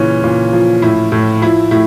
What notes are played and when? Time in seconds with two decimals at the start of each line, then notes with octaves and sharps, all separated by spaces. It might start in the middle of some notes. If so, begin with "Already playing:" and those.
Already playing: A#2 C#3 E3 C#4
0.24 A#2
0.53 F3
0.82 A2 E4
1.12 A2
1.42 F3 E4
1.71 A2 E4